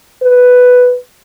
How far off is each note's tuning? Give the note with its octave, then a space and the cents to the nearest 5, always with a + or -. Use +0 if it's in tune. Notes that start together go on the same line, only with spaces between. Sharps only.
B4 +5